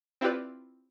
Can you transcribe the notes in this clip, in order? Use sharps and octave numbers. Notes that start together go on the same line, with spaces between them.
C4 E4 F4 G4 B4 D5